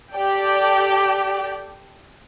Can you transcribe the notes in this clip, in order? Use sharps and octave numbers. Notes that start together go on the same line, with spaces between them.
G4 A4 D5 G5